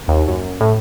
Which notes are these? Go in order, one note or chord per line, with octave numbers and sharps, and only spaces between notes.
D#2
F#2
A2